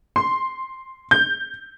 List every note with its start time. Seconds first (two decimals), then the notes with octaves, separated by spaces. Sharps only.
0.16 C6
1.11 G6